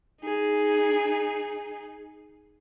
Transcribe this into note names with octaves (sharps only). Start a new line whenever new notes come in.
D#4 G#4